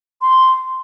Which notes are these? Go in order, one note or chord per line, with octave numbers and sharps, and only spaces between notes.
C6